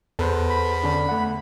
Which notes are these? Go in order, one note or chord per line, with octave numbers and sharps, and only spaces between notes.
E2 A4 B4 C5
B5
D3 C#4 D4
A3 F#5